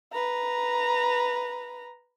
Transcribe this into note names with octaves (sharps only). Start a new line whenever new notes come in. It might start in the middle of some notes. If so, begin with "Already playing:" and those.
B4 A#5